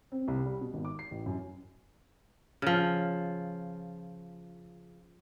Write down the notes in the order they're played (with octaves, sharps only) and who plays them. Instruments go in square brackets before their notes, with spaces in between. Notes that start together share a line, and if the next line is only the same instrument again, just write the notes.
[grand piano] C4
C2
G3
B2
G#1
D6
C7
A1
F#2
[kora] C#3 F3